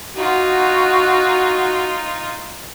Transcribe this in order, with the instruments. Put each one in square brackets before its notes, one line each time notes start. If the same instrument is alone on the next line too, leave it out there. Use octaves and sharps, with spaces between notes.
[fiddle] D#4 F4 [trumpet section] F#4